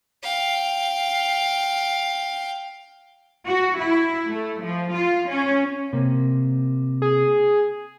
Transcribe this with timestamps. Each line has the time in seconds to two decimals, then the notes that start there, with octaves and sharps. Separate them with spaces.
0.23 F5 G5
3.47 F#4
3.80 E4
4.29 A3
4.63 F3
4.94 F4
5.30 C#4
5.93 C3 A#3
7.02 G#4